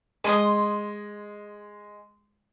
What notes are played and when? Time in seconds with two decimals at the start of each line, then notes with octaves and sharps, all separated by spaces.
0.24 G#3 G#5 C6 D#6